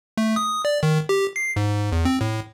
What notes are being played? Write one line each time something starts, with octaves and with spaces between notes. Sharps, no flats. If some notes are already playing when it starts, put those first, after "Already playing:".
A3
D#6
D5
D#3
G4
C7
G#2
E2
C4
A2